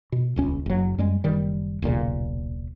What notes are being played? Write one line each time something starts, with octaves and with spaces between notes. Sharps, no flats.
B2
D#1 C#2 C#4
F#1 F#3
F#2 G3 G#3
F#1 D#3 G3
D#1 B1 A#2 C#3